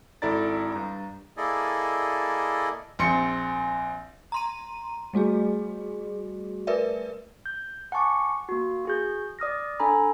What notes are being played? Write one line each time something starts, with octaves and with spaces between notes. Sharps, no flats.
G#1 E4 A4 D5 A#5 A6
G2 A#5
A#3 E4 G#4 A4 D5 D#5
A#1 C4 C6 C#7
A#5 C6 D#7
G3 A3 F#4 G#4
A#4 B4 D5 E5
G6
F#5 G#5 A5 C#6 D6
A#3 F#4
F#4 G#4 G6
D5 D#6 F6 A#6
D4 A4 G#5 A#5 B5